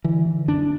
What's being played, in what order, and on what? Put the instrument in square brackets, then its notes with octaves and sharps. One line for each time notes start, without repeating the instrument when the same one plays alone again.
[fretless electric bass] D3 E3
D3
F#2 D4